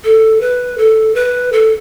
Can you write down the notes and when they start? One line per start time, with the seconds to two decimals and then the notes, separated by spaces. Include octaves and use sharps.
0.04 A4
0.41 B4
0.78 A4
1.15 B4
1.52 A4